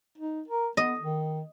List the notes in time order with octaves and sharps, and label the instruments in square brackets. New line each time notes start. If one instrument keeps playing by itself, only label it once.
[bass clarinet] D#4
A#4
[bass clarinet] B3 [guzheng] D#5
[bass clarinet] D#3